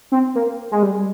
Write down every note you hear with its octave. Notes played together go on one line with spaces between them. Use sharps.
C4
A#3
G#3
G3